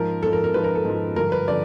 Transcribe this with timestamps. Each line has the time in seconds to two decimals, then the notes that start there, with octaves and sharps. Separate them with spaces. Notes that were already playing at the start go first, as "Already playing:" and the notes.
Already playing: G#2 F3 A#4
0.23 G#2 F3 A4
0.33 A#4
0.44 A#4
0.54 G#2 F3 B4
0.64 A#4
0.75 A4
0.85 G#2 F3
1.16 G2 D3 F3 A#4
1.32 B4
1.48 D3 F3 D5